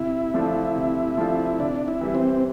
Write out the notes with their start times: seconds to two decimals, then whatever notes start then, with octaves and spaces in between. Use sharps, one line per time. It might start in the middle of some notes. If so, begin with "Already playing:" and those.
Already playing: C3 E4
0.34 F3 A3 D4 F4
0.76 C3
1.17 F3 A3 D4 F4
1.60 C3 D4
1.88 E4
2.01 E3 G3
2.15 C4